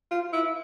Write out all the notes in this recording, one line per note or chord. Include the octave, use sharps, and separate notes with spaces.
F4
E4